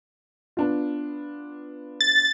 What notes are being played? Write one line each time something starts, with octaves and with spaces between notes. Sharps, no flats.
B3 D4 F4
A6